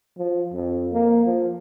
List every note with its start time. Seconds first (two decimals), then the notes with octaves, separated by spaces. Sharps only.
0.17 F3
0.53 F2
0.93 A#3
1.25 F3